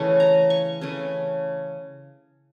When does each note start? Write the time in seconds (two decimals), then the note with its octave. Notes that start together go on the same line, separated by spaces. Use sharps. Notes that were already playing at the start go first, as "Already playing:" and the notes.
Already playing: C#3 E3 A3 C#4 C#6
0.20 A#5
0.50 C#6
0.81 C#3 E3 A3 C#4